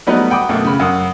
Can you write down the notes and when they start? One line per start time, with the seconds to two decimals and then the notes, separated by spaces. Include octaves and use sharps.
0.07 F#3 G3 A3 B3 D#4 B4
0.30 F#5 G5 B5 D6 D#6
0.49 F#2 B2 A3
0.65 C#3 B5
0.80 F#2 F#5 D#6